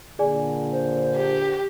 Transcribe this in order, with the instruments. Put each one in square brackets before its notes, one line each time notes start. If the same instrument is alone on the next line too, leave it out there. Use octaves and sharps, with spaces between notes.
[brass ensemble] A#2 D3 [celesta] G#4 D5 G#5
[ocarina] C5
[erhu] G4